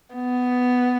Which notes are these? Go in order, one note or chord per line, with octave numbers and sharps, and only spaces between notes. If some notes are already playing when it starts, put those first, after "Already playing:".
B3